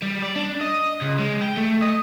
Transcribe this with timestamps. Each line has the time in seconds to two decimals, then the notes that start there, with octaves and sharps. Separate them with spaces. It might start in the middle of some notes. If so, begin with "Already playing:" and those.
0.02 G3
0.22 D5
0.36 D4
0.61 D#5
1.02 C#2
1.19 G#3
1.41 G5
1.57 A3
1.82 D#5